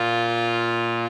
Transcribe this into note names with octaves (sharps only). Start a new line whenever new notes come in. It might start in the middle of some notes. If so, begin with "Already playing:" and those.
Already playing: A#2 F4